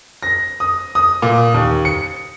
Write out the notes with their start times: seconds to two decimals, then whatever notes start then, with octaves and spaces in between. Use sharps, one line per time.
0.23 A#6
0.60 D#6
0.95 D#6
1.22 A#2
1.54 D#2
1.85 C#7